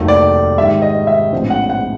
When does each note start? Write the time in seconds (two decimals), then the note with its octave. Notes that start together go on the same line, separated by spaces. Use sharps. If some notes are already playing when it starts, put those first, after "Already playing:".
Already playing: F1 D#2 D#3 F#3 A3
0.08 D5
0.57 G#2 D#3 G3 E5
0.82 D#5
1.07 E5
1.32 A#1 A2 F3 G#3 C4
1.50 F#5
1.70 F#5